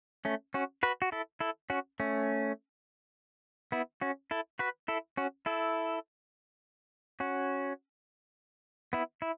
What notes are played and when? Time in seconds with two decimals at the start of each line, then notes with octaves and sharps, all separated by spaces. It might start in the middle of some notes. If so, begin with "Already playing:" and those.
0.25 A3 C#4
0.54 C#4 F#4
0.83 F#4 B4
1.02 F#4
1.12 E4 A4
1.40 E4 A4
1.70 C#4 F#4
2.00 A3 C#4
3.72 B3 E4
4.01 C#4 F#4
4.31 E4 A4
4.59 F#4 B4
4.88 E4 A4
5.17 C#4 F#4
5.46 E4 A4
7.20 C#4 F#4
8.93 B3 E4
9.22 E4